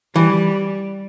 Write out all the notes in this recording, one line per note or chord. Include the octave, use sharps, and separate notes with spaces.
E3 G3